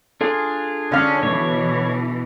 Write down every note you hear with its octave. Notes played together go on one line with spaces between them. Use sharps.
D4 F4 G#4 A4
D3 C#4 F5
B2 E3 C#5